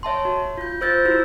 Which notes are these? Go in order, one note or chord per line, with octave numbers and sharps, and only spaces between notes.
C#5 E5 A5 C6
F#4
F4 G6
F4 C5 E6 G6 A6
E4 F#4 E6